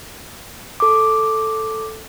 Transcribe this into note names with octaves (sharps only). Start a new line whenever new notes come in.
A4 D6